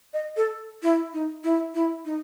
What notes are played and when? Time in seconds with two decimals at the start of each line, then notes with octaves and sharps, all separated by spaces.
0.14 D#5
0.37 A4
0.83 E4
1.13 D#4
1.44 E4
1.74 E4
2.05 D#4